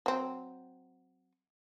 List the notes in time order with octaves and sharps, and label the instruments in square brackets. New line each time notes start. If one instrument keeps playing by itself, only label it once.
[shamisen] F#3 C4